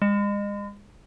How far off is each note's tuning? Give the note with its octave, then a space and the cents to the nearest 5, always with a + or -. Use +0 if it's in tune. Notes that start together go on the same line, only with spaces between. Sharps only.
G#3 -35